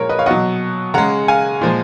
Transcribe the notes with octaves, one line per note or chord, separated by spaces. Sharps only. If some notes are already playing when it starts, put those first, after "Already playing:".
Already playing: A#2 F3 G#3 A#4 C#5
B4 D#5
C#5 F5
B2 F#3 D#5 F#5
C#3 G#3 F#5 A#5
F5 G#5
A#2 F3 G#3